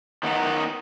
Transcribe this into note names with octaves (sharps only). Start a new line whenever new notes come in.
D#3 B3 D#4